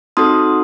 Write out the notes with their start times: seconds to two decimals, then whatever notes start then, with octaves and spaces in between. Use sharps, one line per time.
0.17 C4 D#4 F#4 A4 C6 D#6